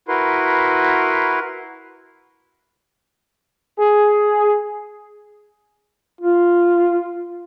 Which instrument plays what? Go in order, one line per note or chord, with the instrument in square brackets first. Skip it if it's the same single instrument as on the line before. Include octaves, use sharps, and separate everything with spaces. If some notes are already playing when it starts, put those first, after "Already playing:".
[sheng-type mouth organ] E4 F#4 A#4 B4 C6
[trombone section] G#4
[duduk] F4